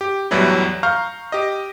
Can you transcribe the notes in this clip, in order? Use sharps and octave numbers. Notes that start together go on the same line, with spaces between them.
G4
E2 A2 E3 F#3 G3 E4
F5 A#5 C#6 F6 G6
G4 D#5